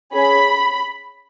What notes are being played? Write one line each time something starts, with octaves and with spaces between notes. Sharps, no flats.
C#4 G#4 B5